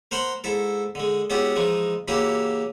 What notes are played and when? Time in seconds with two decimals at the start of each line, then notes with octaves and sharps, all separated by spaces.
0.11 A#4 C5 F#5 B5 C6
0.44 G#2 E4 A4
0.95 D3 G#3
1.30 G#3 B3 C#4 E4 F#4 G4
1.56 E3 F3 G#3 D#4
2.08 C#3 E3 A#3 E4 F#4 G4